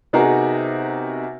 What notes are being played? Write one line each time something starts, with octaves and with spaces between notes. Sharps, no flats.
C3 B3 D#4 F#4 G#4 A#4